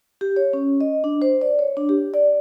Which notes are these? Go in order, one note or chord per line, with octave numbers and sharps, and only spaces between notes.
G4
C#5
C#4
D#5
D4
C5
D5
C#5
D4
G4
D5